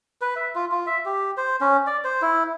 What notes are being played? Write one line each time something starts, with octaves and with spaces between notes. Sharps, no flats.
B4
E5
F4
F4
E5
G4
C5
C#4
D5
C5
E4